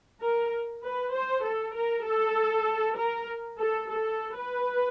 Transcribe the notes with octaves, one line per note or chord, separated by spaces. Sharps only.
A#4
B4
C5
A4
A#4
A4
A#4
A4
A4
B4